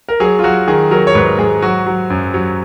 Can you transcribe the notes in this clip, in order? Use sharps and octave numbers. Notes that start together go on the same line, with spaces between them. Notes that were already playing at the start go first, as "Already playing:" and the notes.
A#4
F#3 G#4
F4
F#3 F#4
D#3 G#4
F#3 A#4
C#5
G#2 B4
G#2 G#4
F#3 F#4
F#3
F#2
F#3